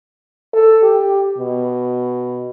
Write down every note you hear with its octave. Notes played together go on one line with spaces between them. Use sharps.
A4
G4
B2